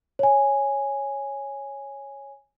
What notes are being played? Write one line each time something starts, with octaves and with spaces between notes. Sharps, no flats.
C#5 G#5